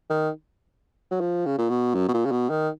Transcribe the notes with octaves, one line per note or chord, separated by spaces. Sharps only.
D#3
F#3
F3
C#3
A#2
B2
F#2
B2
A#2
C#3
B2
D#3